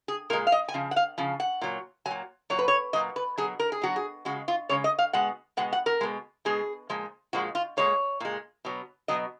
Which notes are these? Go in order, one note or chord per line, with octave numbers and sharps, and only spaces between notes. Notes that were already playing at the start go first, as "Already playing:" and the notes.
G#4
A#2 G#3 A#4
F5
D#5
G#5
C#3 F3
F#5
F5
C#3 F3
F#5
A#2 F#3
F#3 G#5
A#2
A#2 F#3 C#5
B4
C#5
A#2 F#3 D#5
B4
B2 F#3 G#4
A#4
G#4
B2 F#3 F#4
G#4
C#3 G#3 F#4
F4
C#3 G#3 C#5
D#5
F5
B2 G#3 F#5
B2 G#3 F#5
F#5
A#4
B2 G#3
B2 G#3 G#4
A#2 F3 G#3
A#2 F3 G#3 F#4
F4
A#2 G#3 C#5
A#2 G#3
B2 F#3
B2 F#3 D#5